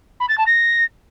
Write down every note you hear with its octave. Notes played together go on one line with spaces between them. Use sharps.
B5
A6
A5
A#6